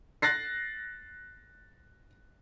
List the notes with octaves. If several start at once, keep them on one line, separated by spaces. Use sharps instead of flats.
F#6 A6 A#6 C7